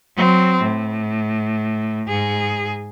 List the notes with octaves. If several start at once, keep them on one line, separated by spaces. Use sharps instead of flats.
F#3 C4
A2
G#2 G#4